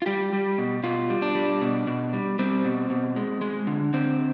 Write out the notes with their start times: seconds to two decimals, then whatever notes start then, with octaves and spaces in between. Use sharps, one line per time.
0.02 F4
0.06 G3 G4
0.33 G3
0.58 B2
0.83 B2 F4
1.10 G3
1.22 D4
1.35 G3
1.61 B2
1.87 B2
2.13 G3
2.39 G3 C4
2.65 B2
2.90 B2
3.16 G#3
3.41 G#3
3.67 D3
3.94 D3 C4